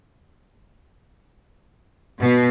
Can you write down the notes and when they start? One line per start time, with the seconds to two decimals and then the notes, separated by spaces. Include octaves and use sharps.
2.20 B2